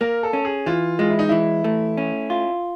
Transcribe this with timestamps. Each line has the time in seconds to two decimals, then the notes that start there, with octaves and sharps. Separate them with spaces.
0.01 A#3 A#4
0.23 A4
0.33 C#4
0.45 G#4
0.66 E3 F4
0.99 G#3 F4
1.10 E4
1.19 D#4
1.29 E3 E4
1.64 A3
1.97 C#4
2.30 F4